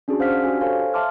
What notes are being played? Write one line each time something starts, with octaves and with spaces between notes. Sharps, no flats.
C#4 D4 F#4 G#4
C#4 C5 F5 F#5 F6 B6
D4 F#4 G4 G#5
A4 C5 C#5 F5 G#5
E5 F5 A5 C6 D6 F6